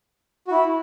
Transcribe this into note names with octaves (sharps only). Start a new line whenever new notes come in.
F#4
E4